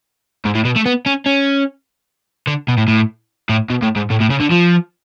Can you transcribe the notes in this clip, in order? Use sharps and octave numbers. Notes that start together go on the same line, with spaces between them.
G#2
A2
B2
A3
B3
C#4
C#4
D3
B2
A2
A2
A2
B2
A2
G#2
A2
A2
C#3
D3
F3